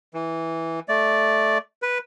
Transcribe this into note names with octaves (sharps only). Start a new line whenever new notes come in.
E3
A3 D5
B4